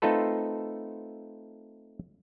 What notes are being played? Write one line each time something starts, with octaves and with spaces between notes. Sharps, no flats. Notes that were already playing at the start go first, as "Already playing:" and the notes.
A3 C4 D#4 F4 A4 B4